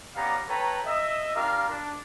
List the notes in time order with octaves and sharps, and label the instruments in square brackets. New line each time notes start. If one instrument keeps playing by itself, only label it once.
[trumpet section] B3 C#4 G4 D5 F5 A#5
A4 B4 C#5 G5 A#5
D#5 E5
D4 F4 G4 A#4 F5 A#5
D4